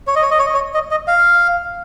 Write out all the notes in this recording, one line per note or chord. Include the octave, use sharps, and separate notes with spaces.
C#5
D#5
C#5
D#5
C#5
D#5
C#5
D#5
D#5
F5